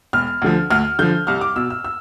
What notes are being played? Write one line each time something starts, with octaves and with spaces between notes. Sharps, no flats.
E1 F6
D2 D3 F3
D2 F6
D3 F3 G6
C2 F6
D6
B2 E6
E6
E6